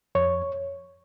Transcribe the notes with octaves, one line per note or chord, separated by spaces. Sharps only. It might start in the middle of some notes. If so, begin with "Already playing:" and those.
F2 C#5